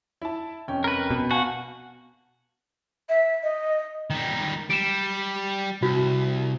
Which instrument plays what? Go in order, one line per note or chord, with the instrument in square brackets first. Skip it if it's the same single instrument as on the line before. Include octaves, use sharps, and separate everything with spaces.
[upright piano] E4 A5
F1 C#4 G5
[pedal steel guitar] A#4 B4
[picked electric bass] B2
[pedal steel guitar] F#4 F#5 [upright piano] F5 G#5 A5
[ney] E5
D#5
[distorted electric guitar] D#3 G3
[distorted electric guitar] G3 [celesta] D7 E7
[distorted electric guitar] C2 [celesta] F#4